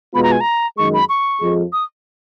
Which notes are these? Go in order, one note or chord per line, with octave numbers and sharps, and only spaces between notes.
B2 G#3 B3 F4 B5
A#5
G#5
A#5
F#2 D#3 G#3 C#6
B5
C#6
F2 F3 G#3
D#6